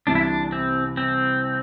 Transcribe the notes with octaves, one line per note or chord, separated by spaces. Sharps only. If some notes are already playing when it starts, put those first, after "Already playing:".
C2 C3 E3 D4
E4
D4
C4
C4